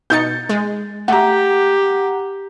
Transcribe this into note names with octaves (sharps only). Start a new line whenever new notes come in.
B2 D#4 G6 A6 C#7
G#3
A3 G4 F#5 A#5